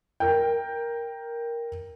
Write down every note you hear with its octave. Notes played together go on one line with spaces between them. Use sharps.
A#4 G5